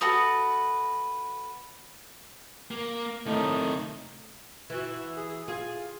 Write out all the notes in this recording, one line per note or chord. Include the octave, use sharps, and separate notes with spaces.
F#4 A4 B4 D#6
A#3
A2 C3 D#3 D#4
E3 F#4
G#4
F4 G#4